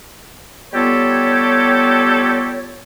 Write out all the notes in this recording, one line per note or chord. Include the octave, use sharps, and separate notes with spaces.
G3 B3 F4 G4 A4 C#5